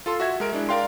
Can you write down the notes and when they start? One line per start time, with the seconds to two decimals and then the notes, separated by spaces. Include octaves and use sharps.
0.06 F4 A4 C6
0.20 F#4 E5 G#6
0.40 G#3 A#4 D7
0.53 G#3 D4 E4
0.69 A#4 D5 F5 G5 C6